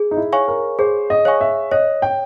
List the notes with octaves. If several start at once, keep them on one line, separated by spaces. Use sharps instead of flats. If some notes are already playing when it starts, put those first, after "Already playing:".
Already playing: G#4
D#4
E4
C#5 F5 G#5 C#6
A#4
G#4 C5
D#5
C#5 F5 G#5 C#6
E5
C#5 D#5
G5